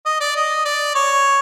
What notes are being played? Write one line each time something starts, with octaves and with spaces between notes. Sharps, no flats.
D#5
D5
D#5
D5
C#5